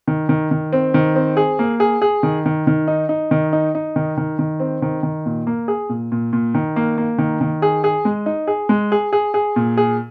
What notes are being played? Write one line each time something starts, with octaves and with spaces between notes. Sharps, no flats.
D#3
D#3
D#3
C4
D#3
C4
G#4
A#3
G#4
G#4
D#3
D#3
D#3
D#4
D#4
D#3
D#4
D#4
D#3
D#3
D#3
C4
D#3
D#3
A#2
A#3
G#4
A#2
A#2
A#2
D#3
A#3
A#3
D#3
D#3
G#4
G#4
G#3
D#4
G#4
G#3
G#4
G#4
G#4
A#2
G#4